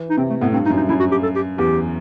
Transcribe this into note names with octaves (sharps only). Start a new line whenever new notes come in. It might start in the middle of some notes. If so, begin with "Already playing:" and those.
Already playing: E3
D#4
C3 C4
A3
A2 B3
G2 C4
D#4
F#2
D#4
F#2 E4
F#4
G4
A4
G4
E2 G4